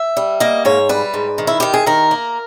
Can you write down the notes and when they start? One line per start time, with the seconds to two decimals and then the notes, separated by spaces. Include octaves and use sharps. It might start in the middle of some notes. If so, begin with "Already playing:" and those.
Already playing: E5
0.17 G3
0.40 A#3 D#5
0.65 G#2 C#5
0.89 G3 B4
1.14 G#2
1.38 D#3
1.47 E4
1.60 D#3 G4
1.74 G#4
1.86 D#3 A#4
2.11 A#3